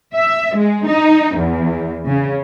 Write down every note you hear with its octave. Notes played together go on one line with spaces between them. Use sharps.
E5
G#3
D#4
E2
C#3